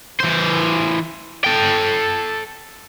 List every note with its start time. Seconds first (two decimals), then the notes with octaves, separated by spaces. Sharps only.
0.20 E3 C5
1.44 A4 G5